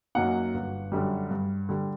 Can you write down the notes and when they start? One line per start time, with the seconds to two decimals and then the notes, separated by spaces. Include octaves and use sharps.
0.15 F#2 F#3 A#3 D#4 F#5
0.54 G1
0.92 F#2 D3 G3
1.31 G2
1.69 D3 G3